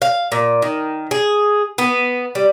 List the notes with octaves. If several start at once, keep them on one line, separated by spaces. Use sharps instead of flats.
F5
A#2
D#3
G#4
B3
G3